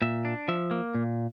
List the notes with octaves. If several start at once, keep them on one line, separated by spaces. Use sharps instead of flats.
A#2 E5
D4
F3 E5
A#3
A#2